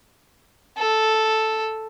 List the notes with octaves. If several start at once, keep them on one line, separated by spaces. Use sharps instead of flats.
A4